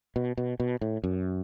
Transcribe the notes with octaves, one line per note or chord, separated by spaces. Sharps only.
B2
B2
B2
A2
F#2